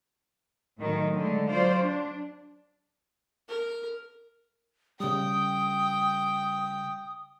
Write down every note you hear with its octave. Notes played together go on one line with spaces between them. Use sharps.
A2 D#3 F#3
D3 G#3 A3
F#3 F4 C5 D5 F5
D4
A#4
C#3 G3 G5 D#6